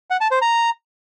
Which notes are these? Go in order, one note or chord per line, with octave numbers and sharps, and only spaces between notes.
F#5
A5
C5
A#5